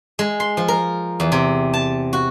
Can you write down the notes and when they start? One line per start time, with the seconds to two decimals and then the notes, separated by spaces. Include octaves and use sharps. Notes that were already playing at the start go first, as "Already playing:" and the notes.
0.19 G#3
0.40 C6
0.57 F3
0.68 A#4
1.20 E2
1.32 C3
1.73 A5
2.13 F#4